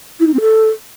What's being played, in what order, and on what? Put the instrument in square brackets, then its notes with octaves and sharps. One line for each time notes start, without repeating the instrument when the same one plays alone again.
[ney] E4
D#4
C4
A4